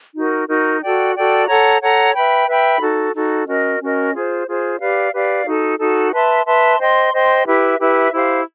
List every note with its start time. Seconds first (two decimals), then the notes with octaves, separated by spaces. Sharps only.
0.15 D#4 F#4 A#4
0.48 D#4 F#4 A#4
0.81 F#4 A4 D5 G5
1.15 F#4 A4 D5 G5
1.47 A4 C#5 F#5 A#5
1.81 A4 C#5 F#5 A#5
2.15 B4 E5 G5 B5
2.48 B4 E5 G5 B5
2.81 D#4 F#4 A4
3.14 D#4 F#4 A4
3.47 C#4 F#4 A#4 D#5
3.80 C#4 F#4 A#4 D#5
4.14 F4 G#4 C5
4.47 F4 G#4 C5
4.80 G4 B4 D5 F5
5.13 G4 B4 D5 F5
5.46 D#4 F#4 A4
5.79 D#4 F#4 A4
6.13 B4 E5 A5 C6
6.46 B4 E5 A5 C6
6.79 C5 D#5 G5 C6
7.13 C5 D#5 G5 C6
7.45 E4 G4 B4 E5
7.80 E4 G4 B4 E5
8.13 E4 G4 C5 F5